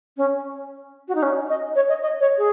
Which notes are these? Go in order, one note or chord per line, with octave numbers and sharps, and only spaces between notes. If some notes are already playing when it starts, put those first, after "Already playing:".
C#4
F#4
D#4
C#4
D#5
C#5
D#5
D#5
C#5
G#4